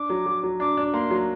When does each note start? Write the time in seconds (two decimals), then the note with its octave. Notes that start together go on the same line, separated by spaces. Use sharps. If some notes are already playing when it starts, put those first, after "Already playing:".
Already playing: D4 D6
0.10 F#3
0.26 F#3
0.43 F#3
0.60 D4 D6
0.77 D4
0.94 A#3 C6
1.10 F#3